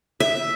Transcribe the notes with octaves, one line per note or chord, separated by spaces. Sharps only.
E5